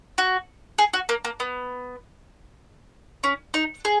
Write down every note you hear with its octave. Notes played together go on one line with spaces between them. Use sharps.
F#4
G#4
F#4
A#3
A#3
B3
C#4
D#4
G#4